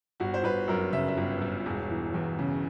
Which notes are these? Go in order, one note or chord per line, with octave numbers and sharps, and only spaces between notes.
G1 F#4
C5
G1 B4
F#2 A#4
C#3 E5
E5
G1
G1
E1
E3
E2
C#3